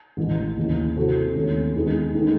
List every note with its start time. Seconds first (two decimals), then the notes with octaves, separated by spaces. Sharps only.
0.17 A1 A2 E3
0.57 D#2 C#3 E3
0.96 C3 E3 C4 F#4 A4
1.35 D#2 D#3 A3 C#4
1.75 E2 D#3 G#3 D#4
2.14 D#3 A3 D#4